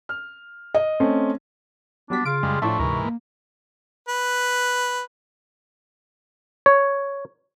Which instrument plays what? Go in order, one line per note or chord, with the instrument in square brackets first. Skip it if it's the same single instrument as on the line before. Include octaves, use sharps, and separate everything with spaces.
[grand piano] F6
[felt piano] D#5
[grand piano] A3 C4 C#4
[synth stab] F#3 G3 B6 [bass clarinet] B3 [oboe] D4
[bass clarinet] C#3 [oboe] F4 [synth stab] D7
[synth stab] F#2 [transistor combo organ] G3 G#3
[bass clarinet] A2 [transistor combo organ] F3 A3 D4 [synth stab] E4 E5 [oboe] C#6
[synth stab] D2 [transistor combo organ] G#2 E3 A#4 [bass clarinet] C3
[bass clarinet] A#3
[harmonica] B4
[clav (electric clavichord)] C#5